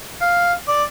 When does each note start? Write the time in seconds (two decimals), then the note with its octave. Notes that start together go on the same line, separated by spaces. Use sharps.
0.21 F5
0.68 D5